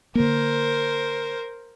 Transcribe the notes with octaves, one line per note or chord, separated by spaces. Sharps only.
D3 A#3 A#4 C5